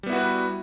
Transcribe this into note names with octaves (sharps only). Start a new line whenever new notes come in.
G3 B3 E4 F#4 B4